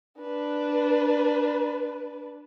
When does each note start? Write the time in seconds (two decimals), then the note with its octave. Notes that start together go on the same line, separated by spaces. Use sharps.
0.20 D4 B4